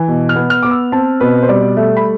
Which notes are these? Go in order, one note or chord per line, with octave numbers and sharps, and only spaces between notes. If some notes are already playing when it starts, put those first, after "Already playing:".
Already playing: E3
B2
F6
B3
F6
B3 D6
E6
C4 A5
B2 B4
C5
G3 D5
A3 E5
B5